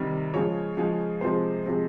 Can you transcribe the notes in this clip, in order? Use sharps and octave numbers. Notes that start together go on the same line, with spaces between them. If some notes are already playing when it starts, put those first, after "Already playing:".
Already playing: C3 D#3 G3
C#3 F3 G#3 C#5
C#3 F3 G#3
C3 F3 G#3 C5
C3 F3 G#3